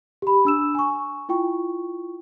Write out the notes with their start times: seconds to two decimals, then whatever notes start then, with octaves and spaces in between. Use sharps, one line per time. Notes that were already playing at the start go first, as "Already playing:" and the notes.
0.22 G4 B5
0.45 D4 E6 E7
0.75 G#5 C#6
1.29 E4 F4 G5 C#6